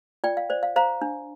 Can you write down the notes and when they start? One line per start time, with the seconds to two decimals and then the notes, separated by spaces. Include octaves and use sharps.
0.24 F4 D5 G5
0.37 F5
0.50 C5 D5
0.63 F5
0.76 C5 F5 A#5
1.02 D4